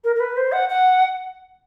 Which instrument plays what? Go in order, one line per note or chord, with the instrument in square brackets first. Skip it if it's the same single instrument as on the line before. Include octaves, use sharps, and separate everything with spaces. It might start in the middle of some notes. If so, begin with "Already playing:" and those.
[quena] A#4
A#4
B4
C5
F#5
F#5